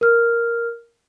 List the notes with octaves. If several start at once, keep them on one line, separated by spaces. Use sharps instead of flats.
A#4 F6